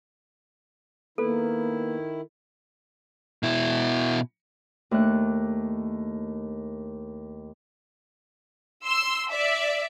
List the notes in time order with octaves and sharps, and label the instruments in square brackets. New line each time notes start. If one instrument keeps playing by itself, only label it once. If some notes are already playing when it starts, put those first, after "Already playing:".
[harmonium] D#3 E4 [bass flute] A#3 [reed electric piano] B3 B4 [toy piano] A4
[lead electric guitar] B2 E4
[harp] D#2 A3 D4 F#6
[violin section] C6 E6
D5 E5